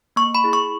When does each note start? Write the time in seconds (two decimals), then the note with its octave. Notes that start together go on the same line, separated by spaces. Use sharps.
0.16 A#3 C#6
0.35 B5
0.44 E4 G#4
0.53 C#6